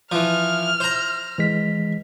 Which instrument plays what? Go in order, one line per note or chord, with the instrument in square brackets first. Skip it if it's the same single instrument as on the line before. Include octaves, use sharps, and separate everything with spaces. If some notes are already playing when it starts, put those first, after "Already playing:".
[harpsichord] E3 F3 [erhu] F6
[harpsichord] C5 A#5
[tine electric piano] E3 G#3 B6